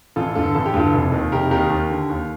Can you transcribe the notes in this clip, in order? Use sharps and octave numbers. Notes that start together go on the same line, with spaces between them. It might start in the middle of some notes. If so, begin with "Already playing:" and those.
A1 F4 A4
G2 D3 F4 A4
A1 A4
G4
G2 D3 F4 A4
F1
D#2 D#3
F1 G4 A#4
D#2 D#3 G4 A#4
D#2
D3
D#2